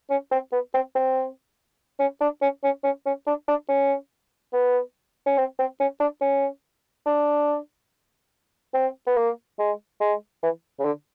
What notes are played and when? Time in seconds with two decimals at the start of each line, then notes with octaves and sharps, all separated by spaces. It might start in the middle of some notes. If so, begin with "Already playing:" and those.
0.10 C#4
0.31 C4
0.52 B3
0.74 C4
0.95 C4
2.00 C#4
2.21 D4
2.42 C#4
2.64 C#4
2.84 C#4
3.06 C#4
3.27 D4
3.48 D4
3.69 C#4
4.53 B3
5.26 C#4
5.38 C4
5.59 C4
5.80 C#4
6.00 D4
6.21 C#4
7.06 D4
8.74 C4
9.07 B3
9.16 A#3
9.59 G#3
10.01 G#3
10.43 E3
10.79 C#3
10.85 D3